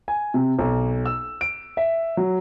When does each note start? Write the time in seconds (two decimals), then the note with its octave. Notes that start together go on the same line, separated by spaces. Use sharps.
0.08 G#5
0.34 C3
0.59 B1
1.06 E6
1.41 D7
1.77 E5
2.17 F#3